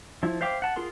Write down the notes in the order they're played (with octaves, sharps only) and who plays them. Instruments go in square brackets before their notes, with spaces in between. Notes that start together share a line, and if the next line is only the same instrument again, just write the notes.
[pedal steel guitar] F3 E4
C5 E5 F5 G5 D6
F#5 A5
F4 G#4 A#4 C6